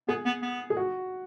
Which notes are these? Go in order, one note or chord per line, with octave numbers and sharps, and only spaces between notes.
B3 G#4
B3
B3
G#4
F#4